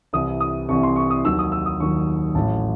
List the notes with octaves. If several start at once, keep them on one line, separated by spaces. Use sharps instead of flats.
C2 C3 E3 D#6
D#6
C2 C3 E3 C#6
C6
C#6
D#6
D#2 D#3 F#3 E6
D#6
E6
D#6
D#2 D#3 F#3 C#6
A1 A2 F#3 A5